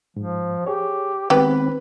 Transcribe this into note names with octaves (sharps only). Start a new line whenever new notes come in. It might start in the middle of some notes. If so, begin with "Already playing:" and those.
G#2 F3
G4 G#4 C#5
D#3 G#3 B3 C4 G4 B4